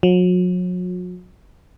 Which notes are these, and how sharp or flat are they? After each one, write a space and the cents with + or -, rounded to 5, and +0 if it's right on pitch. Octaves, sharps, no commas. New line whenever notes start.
F#3 -40